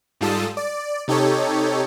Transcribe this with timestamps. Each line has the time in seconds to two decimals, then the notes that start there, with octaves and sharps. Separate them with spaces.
0.21 G#2 G3 F4 A4 A5 D#6
0.57 D5
1.08 C3 D#4 G4 A4 C#5